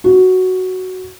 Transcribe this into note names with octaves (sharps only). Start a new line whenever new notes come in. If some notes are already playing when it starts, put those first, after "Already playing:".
F#4